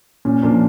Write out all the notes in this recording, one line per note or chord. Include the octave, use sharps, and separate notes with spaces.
A#2 C#4
F3 A#3 D4